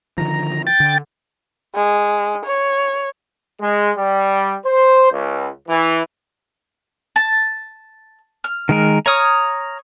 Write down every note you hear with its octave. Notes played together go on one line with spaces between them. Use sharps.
D3 D#3 F3 A#5
G5 A6
D3
G#3
C#5
G#3
G3
C5
C#2
E3
A5
F6
D#3 G#3 A#4
C#5 A#5 D#6 F6